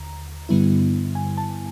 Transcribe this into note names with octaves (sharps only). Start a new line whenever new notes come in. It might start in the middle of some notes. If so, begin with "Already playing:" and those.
Already playing: D#2 D3 A#5
G2 D3 G3 B3 E4
G#5
A5